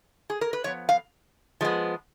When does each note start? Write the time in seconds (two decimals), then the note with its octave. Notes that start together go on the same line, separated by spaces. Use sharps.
0.30 G#4
0.41 A#4
0.53 B4
0.64 F3 C#5
0.67 B3
0.89 F5
1.61 F3 G#3 B3